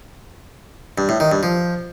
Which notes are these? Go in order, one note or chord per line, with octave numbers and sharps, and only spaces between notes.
G2
A2
D#3
G2
F3